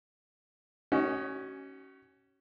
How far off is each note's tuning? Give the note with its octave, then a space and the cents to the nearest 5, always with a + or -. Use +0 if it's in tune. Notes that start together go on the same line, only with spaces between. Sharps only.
C#4 +0 F#4 +40 D#5 -5